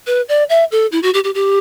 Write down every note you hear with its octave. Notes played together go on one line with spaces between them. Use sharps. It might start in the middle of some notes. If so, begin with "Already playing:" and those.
B4
D5
E5
A4
E4
F#4
G4
G4
G4